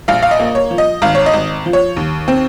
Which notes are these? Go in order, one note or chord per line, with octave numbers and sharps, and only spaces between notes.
A#1 F5
F5
D#5
A#3
C#5
F3
D#5
G#1 F5
C#5
D#5
G#1
F3
C#5
D#2
C4